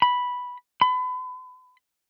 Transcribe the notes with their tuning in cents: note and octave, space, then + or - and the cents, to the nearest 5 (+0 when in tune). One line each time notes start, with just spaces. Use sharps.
B5 -5
B5 +30